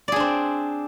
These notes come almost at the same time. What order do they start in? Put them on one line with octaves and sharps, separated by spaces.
D5 G#4 D4 C4